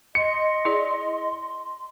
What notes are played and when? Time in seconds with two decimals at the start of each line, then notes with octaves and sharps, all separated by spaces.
0.15 D#5 C6 C#7
0.65 E4 G#4 D5